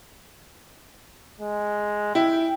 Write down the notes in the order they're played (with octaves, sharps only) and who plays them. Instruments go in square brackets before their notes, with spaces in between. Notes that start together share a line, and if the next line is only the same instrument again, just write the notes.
[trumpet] G#3
[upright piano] E4 [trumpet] G5